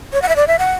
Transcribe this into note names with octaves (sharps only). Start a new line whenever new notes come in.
C#5
F#5
E5
D5
E5
F#5